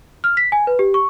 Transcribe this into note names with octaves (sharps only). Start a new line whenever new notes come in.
F6
B6
G#5
B4
G4
C#6